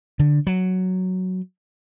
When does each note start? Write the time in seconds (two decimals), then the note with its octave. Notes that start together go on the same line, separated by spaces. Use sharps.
0.19 D3
0.47 F#3